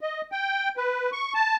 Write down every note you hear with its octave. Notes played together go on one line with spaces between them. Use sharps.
D#5
G5
B4
C#6
A5